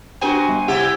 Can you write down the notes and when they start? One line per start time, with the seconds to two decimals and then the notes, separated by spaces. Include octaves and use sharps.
0.21 D4 F#4 G4 C5 G5 G#5
0.49 G3
0.68 C3 E4 G4 F#5